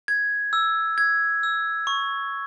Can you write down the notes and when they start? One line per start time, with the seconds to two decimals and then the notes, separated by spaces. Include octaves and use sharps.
0.08 G#6
0.53 E6
0.98 G#6
1.43 E6
1.87 C#6